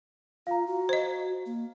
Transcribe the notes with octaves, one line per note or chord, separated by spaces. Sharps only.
F4 F5 A#5
F#4
C5 D#5
A#3